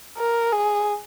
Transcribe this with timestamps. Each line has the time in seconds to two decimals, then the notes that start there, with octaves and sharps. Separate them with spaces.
0.18 A#4
0.52 G#4